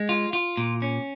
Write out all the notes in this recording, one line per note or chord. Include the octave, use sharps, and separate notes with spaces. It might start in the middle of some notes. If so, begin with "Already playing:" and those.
Already playing: G#3
F4
F4
A#2
C#4